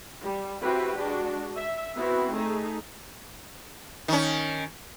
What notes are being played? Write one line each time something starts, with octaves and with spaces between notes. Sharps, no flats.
G3
C4 E4 F#4 G4 B4
G#3 D4 F#4
E5
B3 C4 E4 F#4
A3 D#4 G#4
D#3 C#4